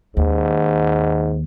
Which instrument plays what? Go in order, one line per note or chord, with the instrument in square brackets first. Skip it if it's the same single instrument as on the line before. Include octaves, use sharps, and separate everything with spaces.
[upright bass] D#2 [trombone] G#2